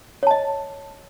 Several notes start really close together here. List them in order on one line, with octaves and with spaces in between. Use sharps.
C#5 A5 D#5